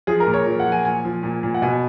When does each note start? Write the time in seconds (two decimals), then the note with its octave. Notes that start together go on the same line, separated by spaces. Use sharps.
0.07 F3 G#4
0.20 A#4
0.27 A#2
0.34 C#5
0.46 F3
0.60 F#5
0.66 F3
0.72 G#5
0.84 A#2 G#5
1.05 F3
1.23 A#2
1.43 A#2
1.54 F#5
1.62 B2 G#5